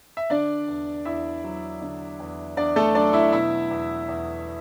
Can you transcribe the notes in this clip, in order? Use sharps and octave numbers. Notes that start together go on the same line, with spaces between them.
E5
D3 D4 D5
E2
E2 E4 E5
F#3
D3
E2
E2 D4 D5
A3 A4
F#3 D4 D5
E4 E5
B2 E4 E5
E2
E2